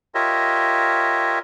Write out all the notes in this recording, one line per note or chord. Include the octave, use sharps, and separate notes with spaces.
F4 G4 A#4 C#5 D#5 E5